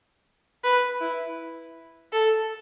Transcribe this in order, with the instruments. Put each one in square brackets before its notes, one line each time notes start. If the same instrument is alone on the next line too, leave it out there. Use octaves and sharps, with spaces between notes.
[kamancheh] B4
E4
A4